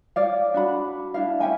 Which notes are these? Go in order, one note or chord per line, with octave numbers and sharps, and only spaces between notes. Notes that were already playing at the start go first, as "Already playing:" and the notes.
C#5 D5 F5
D4 F#4 B5
D4 E4 F5
C#4 E5 G5 G#5